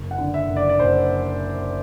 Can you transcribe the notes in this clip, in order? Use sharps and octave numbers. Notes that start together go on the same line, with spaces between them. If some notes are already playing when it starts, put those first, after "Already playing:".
Already playing: F#1
F#5
D3
E5
F#1
D5
D5
F#1 C5